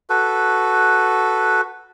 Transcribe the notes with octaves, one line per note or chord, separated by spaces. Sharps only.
F#4 A4 B4